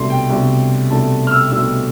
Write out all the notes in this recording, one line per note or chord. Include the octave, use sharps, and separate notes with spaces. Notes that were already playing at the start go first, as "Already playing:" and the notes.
Already playing: C2 B2 A3 D4 C6
G5
C2 B2 A3 D4
C2 B2 A3 D4 A5
F6
E6
C2 B2 A3 D4 E6